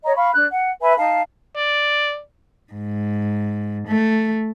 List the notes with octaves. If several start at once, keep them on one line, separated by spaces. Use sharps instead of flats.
C#5 D#5 A#5
F5 B5 C#6
D4 F#6
F#5
B4 E5 G#5 B5
D#4 F5 A5
D5
G#2
A3